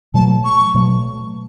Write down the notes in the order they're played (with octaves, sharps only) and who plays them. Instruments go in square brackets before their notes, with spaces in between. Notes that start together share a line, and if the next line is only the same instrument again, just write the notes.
[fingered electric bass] B2 F#3 A3 [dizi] A5
[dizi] C#6
[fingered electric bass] B2 F#3 A3